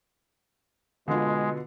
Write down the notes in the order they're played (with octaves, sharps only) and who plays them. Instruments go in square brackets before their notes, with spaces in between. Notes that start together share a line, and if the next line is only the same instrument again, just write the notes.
[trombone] B2 [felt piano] D3 F4 [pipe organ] G#3